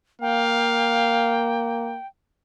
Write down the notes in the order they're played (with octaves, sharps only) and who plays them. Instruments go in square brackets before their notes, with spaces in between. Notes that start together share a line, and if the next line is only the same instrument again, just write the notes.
[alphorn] A#3 [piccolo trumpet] F5 [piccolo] G5